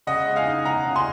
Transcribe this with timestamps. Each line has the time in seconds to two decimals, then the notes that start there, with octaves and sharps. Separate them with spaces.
0.07 C#3 D#5 F#5
0.26 G#3
0.36 F5 G#5
0.47 D#4
0.65 C#3 F#5 A#5
0.86 C#3
0.96 G#5 C6